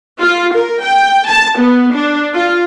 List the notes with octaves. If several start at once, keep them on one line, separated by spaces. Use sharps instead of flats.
F4
A#4
G5
A5
B3
D4
F4